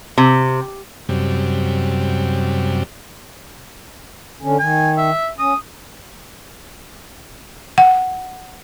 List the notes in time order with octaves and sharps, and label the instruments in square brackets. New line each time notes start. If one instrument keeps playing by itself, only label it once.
[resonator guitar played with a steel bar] C3
[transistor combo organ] F#2 C3 G3
[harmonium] D3 C#4
[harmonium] D#3 [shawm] G#5
[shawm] E5
[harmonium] C#4 [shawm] D#6
[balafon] F#5